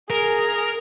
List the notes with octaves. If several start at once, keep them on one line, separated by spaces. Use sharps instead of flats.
G#4 A#4